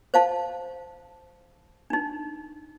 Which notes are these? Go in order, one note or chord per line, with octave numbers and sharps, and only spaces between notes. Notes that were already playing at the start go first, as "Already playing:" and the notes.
C5 F5 A5
D4 D#4